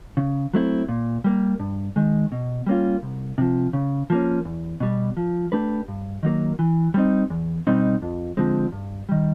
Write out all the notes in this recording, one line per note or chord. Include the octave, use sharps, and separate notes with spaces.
C#3
F#3 A3 C4 E4
A#2
G3 A#3
G2
D#3 G#3
B2
G3 A#3 C#4 F4
C2
C3 F3
C#3
F3 A#3 C#4
E2
B2 G3
F3
A3 D4 G4 B4
G2
D#3 F#3 A#3
E3
G3 C4 D#4
E2
B2 G3 C4 D#4
F2
D3 F3 G#3 C4
G2
D#3 G3